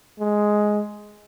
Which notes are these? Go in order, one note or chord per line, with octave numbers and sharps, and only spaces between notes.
G#3